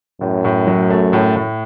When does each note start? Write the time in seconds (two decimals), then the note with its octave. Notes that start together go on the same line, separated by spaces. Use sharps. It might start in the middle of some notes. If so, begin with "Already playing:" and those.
0.21 F#2 A2
0.45 A2
0.67 F#3
0.90 A3
1.13 A2
1.36 A2